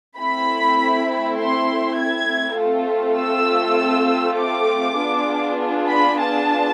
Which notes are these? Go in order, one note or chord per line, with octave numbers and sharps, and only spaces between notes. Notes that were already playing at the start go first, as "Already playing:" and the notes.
A3 C4 E4 B5
C6
G#6
A3 C4 F4 A4
E6
D6
B3 D4 F4 G#4
B5
A5